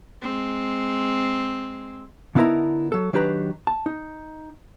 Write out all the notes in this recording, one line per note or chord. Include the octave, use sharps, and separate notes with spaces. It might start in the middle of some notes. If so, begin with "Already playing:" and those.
G#3 C4
D3 B3 D#4 E4 A#4 A#5
F#3 A4
D#3 F#3 D4 G4 B4 A#5
A5
D#4